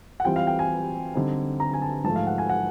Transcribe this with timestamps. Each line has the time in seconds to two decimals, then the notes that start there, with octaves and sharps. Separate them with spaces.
0.20 F#5
0.25 E3 G3 C4 F4 G5
0.36 F5
0.47 G5
0.59 G#5
1.14 D3 G3 C4 D#4
1.60 A#5
1.73 G#5
1.82 A5
2.04 G#2 F3 A3 A5
2.16 F5
2.27 F#5
2.38 G#5
2.49 F#5